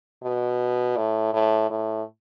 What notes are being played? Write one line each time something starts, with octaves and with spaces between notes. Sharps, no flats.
B2
A2
A2
A2